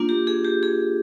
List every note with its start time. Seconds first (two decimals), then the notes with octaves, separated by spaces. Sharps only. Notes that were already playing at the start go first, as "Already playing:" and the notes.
Already playing: A#3 D4 F4
0.09 G4
0.27 G#4
0.44 G4
0.63 G#4